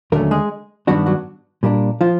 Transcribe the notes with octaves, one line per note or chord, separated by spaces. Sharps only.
D#2 D3 F#3 A3 A#3 C#4 A#4
G#3 G#4
G2 D#3 F#3 G3 B3 D4 F#4
F#3 F#4
A#2 G3 A#3 D4
F3 F4